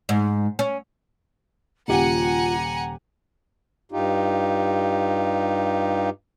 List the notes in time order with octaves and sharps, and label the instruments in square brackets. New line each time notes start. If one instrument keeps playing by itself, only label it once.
[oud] G#2
C#4
[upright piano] D#1 C#3 G4 [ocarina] F4 [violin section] F#5 G#5 C#7 [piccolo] A#5
[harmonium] G2 D#4 F4 G4